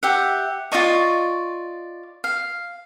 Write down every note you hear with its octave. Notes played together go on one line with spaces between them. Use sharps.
G4 E5 F#5
F4 D5 D#5 C#6
F5